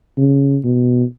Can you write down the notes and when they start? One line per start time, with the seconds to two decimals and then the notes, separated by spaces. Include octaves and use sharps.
0.18 C#3
0.63 B2